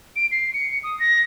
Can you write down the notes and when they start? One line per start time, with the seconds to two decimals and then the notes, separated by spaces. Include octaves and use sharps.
0.16 D7
0.32 C7
0.53 C#7
0.83 D#6
1.00 A#6